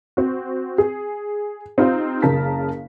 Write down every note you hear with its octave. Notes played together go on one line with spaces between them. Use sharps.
C4 F#4
G#4
C4 D#4 F4 G4 C5
F#1 C#3 A#4 A5 B6